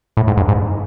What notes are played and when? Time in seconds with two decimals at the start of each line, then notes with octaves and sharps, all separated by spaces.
0.17 A2
0.27 G#2
0.37 G2
0.48 G#2